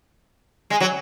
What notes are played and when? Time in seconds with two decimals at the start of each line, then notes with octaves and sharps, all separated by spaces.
0.70 G#3
0.80 F#3